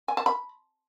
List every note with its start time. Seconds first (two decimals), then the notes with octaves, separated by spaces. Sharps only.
0.08 G#5
0.17 A5
0.26 B5